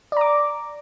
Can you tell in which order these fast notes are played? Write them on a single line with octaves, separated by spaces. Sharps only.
D5 A#5 D6